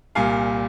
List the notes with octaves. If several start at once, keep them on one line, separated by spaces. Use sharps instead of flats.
C2 A#2 G3 F5 G#5